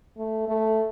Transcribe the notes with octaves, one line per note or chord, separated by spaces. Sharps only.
A3
A3